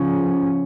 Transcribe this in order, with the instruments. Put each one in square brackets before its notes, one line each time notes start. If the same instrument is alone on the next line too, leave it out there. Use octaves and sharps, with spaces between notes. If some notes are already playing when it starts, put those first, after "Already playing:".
Already playing: [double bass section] C#3 F3 C#4